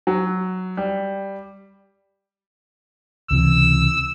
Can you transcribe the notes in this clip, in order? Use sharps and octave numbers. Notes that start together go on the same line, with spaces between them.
F#3
G3
C#2 C3 E3 E6